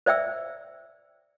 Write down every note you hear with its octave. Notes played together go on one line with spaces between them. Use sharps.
C5 D5 E5 G5 E6